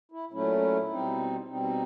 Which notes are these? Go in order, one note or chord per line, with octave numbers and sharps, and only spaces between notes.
E4
A#2 F#3 A3 C#4 E4
E4
B2 G3 C4 D#4
B2 G3 C4 D#4
D#4